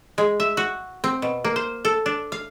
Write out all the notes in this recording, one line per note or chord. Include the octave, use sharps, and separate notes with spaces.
G#3
E5
F#4
C4
B2
A#3
C5
A4
D4
F5